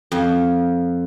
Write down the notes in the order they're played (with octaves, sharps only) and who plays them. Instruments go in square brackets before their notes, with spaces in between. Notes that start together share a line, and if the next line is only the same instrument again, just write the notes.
[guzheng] F2